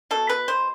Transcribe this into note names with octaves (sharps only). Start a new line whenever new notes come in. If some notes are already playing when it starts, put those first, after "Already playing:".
B2 A4
B4
B2 C5